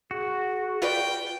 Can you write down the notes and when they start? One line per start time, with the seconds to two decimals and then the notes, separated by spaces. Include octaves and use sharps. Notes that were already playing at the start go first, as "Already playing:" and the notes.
0.11 F#4 G#4
0.82 F4 B4 D5 G5